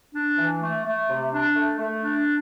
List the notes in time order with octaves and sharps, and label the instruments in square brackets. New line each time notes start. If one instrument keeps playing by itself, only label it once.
[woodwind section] D4
E3
A3
A3
C3
D4
A3
A3
D4